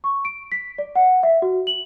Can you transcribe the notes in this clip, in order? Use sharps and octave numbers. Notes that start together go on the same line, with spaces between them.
C#6
D7
B6
D5
F#5
E5
F#4
F#7